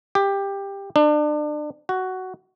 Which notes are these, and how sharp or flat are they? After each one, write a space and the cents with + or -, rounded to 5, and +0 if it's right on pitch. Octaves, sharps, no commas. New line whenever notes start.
G4 +15
D4 +30
F#4 +10